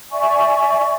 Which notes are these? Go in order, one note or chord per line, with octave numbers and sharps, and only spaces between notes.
D5 E5 G#5 C#6